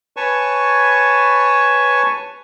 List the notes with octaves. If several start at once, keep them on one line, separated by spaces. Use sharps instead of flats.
B4 C#5 G#5 A5 C#6